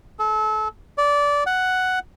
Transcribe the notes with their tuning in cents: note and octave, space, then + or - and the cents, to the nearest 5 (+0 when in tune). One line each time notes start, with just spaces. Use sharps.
A4 -30
D5 -20
F#5 +5